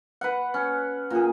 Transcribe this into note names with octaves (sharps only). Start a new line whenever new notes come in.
B4 F#5
C#4
A#2 G#4